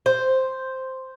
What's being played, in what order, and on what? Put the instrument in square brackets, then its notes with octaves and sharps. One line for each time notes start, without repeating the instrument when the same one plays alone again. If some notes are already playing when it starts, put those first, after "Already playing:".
[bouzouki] C5